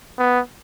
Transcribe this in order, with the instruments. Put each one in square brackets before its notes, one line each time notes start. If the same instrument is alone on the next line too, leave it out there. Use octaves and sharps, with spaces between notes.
[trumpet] B3